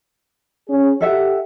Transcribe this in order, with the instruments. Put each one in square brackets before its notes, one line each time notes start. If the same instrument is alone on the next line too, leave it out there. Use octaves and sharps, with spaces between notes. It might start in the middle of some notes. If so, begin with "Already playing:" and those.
[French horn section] C#4 G#4
[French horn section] G4 [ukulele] A4 E5 F#5